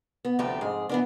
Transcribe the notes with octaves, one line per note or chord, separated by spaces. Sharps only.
B3
D2 C3 F3 A3 G4 B4
F2 G#2 G#4
E3 B3 D4